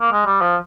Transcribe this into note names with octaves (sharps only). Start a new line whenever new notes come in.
A#3
G#3
G3
F3